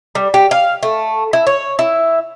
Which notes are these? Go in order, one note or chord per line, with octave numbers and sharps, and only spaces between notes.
G3
G4
F5
A3
E4
C#5
E4